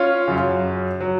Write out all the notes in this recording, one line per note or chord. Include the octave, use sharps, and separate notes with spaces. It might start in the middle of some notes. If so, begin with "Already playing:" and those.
Already playing: C#4 F4
F#2 C#3 F#3
F#3